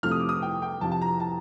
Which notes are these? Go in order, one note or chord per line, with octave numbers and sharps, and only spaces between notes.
F2 C3 F3 A3 C4 F6
D#6
D6
D#6
G5
G5
F2 C3 F3 A5
A5
A#5
A5